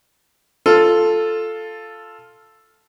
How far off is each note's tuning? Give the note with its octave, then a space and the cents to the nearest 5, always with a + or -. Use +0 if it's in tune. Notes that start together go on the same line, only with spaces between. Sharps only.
F4 +0 A4 +0